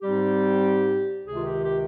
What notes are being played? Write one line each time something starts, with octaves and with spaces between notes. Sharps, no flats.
G#2 G3 C4 D#4 G4
C#2 C3 D#3 G#4
F4
G4
G4